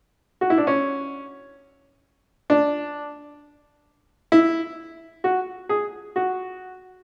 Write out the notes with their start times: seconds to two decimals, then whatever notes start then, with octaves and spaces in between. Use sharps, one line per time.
0.41 F#4
0.50 E4
0.58 D4
0.67 C#4
2.50 D4
4.32 E4
5.24 F#4
5.69 G#4
6.16 F#4